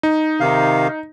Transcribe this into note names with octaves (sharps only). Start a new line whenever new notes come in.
D#4
C3 D#3 F5